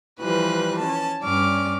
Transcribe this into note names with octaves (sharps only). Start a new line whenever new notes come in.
E3 F3 G3 B4 F#6
C#4 A5
G2 C#4 D5 D6 F6